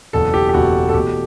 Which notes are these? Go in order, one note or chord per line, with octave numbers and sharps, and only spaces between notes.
F#1 E2 B2 A4
G4
G4
F#1 E2 B2 F#4
A4
E2 B2 A3 G4